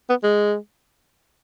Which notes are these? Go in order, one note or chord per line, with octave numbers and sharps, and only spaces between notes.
B3
G#3